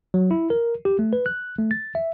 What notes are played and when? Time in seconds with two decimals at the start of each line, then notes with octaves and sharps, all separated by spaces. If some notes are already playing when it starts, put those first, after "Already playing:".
0.14 F#3
0.31 E4
0.50 A#4
0.85 G4
0.99 A3
1.13 B4
1.26 F#6
1.59 A3
1.71 A6
1.95 E5